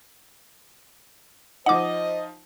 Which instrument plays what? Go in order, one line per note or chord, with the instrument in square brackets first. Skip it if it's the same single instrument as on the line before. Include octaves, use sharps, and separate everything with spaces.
[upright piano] F3 D#4 [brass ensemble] C5 D#5 [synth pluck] F#5 D6